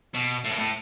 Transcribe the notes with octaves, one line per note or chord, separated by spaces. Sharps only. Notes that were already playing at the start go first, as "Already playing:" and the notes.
B2
A2
B2
A2